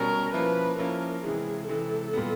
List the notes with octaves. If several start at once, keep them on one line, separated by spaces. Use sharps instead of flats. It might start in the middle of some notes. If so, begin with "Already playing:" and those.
Already playing: B2 G3 C#4 A#4
F3 A#3 C#4 E4 B4
F3 A#3 C#4 E4 A#4
C3 E3 G#3 G#4
C3 E3 G#3 A4
A#2 G3 B3